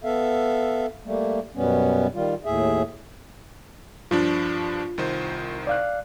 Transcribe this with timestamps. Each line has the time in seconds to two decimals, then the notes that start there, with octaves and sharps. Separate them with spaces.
0.04 B3 A4 E5 F5
1.06 G3 A3 A#3
1.55 F#2 B2 G3 B3 C#4
2.15 D#3 G3 F4
2.45 D#2 A2 G#4 E5
4.11 G2 F3 D4 F4
4.98 C2 D#3 C5
5.67 D5 F5 F#6